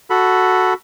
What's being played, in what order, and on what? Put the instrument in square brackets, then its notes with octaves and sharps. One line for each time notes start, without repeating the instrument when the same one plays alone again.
[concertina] F#4 A4 B5